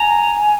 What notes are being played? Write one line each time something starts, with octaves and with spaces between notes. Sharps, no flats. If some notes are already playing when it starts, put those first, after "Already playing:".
Already playing: G#5 A#5